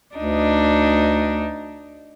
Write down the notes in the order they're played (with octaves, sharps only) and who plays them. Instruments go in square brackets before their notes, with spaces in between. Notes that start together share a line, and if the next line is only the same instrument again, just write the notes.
[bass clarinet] D2 [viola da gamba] D4 D#4